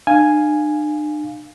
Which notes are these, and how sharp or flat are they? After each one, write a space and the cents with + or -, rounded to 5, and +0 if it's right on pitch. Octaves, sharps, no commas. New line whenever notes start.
D4 +45 F5 +0 G#5 +0